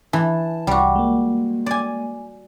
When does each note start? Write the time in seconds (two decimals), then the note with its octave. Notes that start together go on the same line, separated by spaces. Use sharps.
0.13 E3 A5
0.67 C2 G3 F#4
0.96 G#3 A#3
1.66 D5 G#5